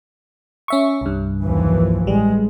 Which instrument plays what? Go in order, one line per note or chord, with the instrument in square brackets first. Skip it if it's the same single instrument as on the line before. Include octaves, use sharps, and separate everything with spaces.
[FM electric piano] C#4 E5 C#6
C2 G2
[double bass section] D#2 E3 F3
[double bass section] A1 G#3 [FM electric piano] G3